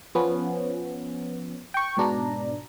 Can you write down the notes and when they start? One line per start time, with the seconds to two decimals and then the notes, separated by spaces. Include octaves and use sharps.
0.15 F3 B3 C#4
1.74 G5 C#6
1.97 G#2 B2 D4 A#5